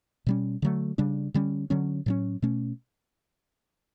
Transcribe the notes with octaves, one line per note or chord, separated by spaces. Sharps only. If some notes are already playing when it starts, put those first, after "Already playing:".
B2 G3 C#4
D3 F#3 A3
C#3 G3 D4
D3 G3 C#4
D3 F#3 C#4
A2 F#3 C#4
B2 A3 C#4